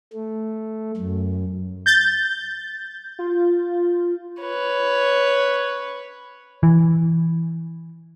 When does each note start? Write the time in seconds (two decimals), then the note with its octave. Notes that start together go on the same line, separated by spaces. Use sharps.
0.13 A3
0.97 F#2
1.86 G6 A6
3.19 F4
4.41 B4 C#5
6.63 E3